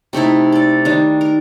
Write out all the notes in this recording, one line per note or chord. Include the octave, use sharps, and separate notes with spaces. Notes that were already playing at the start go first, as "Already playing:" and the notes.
C3 A3 D#4 E4
A4 D5
D#3 G3 D4
A#4